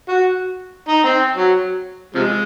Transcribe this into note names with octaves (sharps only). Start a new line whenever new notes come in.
F#4
D#4
C4
F#3
C3 F3 G#3